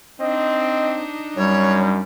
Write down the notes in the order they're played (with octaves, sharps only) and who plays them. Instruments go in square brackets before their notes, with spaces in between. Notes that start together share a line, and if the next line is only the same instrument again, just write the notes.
[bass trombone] C4 [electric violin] D4 D#4 [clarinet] D#5
[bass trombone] F#2 [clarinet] G3 [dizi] C#5